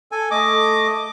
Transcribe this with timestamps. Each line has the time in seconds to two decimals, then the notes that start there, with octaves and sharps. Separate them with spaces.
0.12 A4 G#5
0.31 A3 D#5 D6